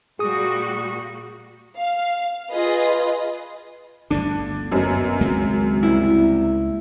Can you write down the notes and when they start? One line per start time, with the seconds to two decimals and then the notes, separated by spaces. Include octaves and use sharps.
0.19 A#2 G3 F#4 G#4 D#6
1.78 F5
2.52 F4 G#4 B4 D#5
4.10 G1 D2 D3 D4
4.72 F#2 B2 F#3
5.21 G#1 C#2 G#3 A#3
5.83 C2 E4